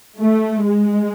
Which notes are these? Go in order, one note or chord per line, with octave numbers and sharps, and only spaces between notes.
A3
G#3